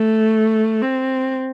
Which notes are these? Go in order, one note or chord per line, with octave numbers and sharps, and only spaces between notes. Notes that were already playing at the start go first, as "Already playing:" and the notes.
Already playing: A3
C4